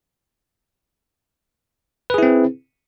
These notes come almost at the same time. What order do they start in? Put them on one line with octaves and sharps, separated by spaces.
B4 G#4 E4 C4